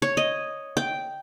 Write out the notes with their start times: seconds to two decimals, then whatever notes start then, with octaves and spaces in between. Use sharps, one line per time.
0.02 C#5
0.17 D#5
0.77 G5